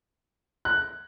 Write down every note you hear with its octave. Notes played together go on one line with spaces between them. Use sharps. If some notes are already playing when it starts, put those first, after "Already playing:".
F#6